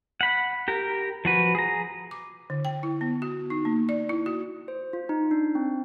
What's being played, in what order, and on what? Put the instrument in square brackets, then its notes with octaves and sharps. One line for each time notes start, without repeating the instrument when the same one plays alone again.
[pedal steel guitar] F#5 B5
G4 A#4
F3 F#4 B4
G#4 A#5
[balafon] D6
D3
G5
E4
B3
F#4
D#4
A#3
D5
E4
F#4
[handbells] C5
F4
D#4
D4
C4